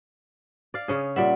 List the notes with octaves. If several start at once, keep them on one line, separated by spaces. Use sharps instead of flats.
D5 F5
C#3 C#4 G#4
A#2 G3 D5 E5 F#5